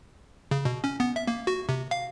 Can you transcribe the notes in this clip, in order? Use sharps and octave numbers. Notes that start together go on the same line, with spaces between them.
C#3
B2
C#4
B3
E5
A#3
F#4
C3
F5